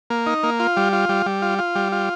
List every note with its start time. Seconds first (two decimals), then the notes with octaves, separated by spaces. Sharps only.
0.10 A#3
0.26 D#4
0.43 A#3
0.60 F4
0.77 G3
0.93 F4
1.09 G3
1.26 G3
1.42 F4
1.58 F4
1.75 G3
1.92 F4